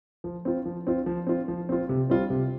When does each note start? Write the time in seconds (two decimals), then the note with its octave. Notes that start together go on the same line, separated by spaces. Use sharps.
0.24 F3
0.45 C4 F4
0.65 F3
0.87 C4 F4
1.06 F3
1.27 C4 F4
1.48 F3
1.69 C4 F4
1.89 C3
2.10 G3 C4 F4
2.30 C3